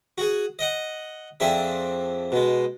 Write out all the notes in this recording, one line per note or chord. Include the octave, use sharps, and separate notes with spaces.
F#4 G#4
D#5 F#5
F2 C4 D4 G#4 E5
B2 G#3